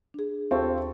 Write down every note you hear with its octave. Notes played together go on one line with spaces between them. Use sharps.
D4 G#4
D#2 C4 F4 G4 A4 C#6